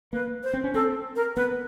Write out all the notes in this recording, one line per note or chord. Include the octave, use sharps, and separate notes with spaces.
A#3 B4
C5
C4
C#4
C4 A4
A#4
B3 B4